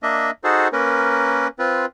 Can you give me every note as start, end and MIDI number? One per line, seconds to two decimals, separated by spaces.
0.03 0.31 58
0.03 0.31 62
0.03 0.31 75
0.03 0.31 76
0.44 0.68 63
0.44 0.68 66
0.44 0.68 68
0.44 0.68 69
0.44 0.68 72
0.73 1.48 58
0.73 1.48 61
0.73 1.48 70
0.73 1.48 71
1.59 1.86 60
1.59 1.86 65
1.59 1.86 71